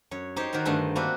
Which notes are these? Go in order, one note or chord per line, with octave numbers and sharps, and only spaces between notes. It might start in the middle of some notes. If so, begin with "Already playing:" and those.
F#2 C#5
D#4 G4 C5 C#5
D#3 F#4 A#4 C5
G2 D3 D#3 A3 D#5 G#5
A#3 C4 D4 F#4 B4